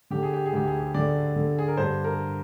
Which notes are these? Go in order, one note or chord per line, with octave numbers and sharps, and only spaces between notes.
D3 G4
G#4
G4
G#4
D2 G4
G#4
G4
D3 D5
D3
G#4
A#4
G2 C5
A#4